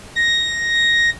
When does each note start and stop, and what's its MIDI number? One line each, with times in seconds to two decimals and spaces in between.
0.16 1.10 94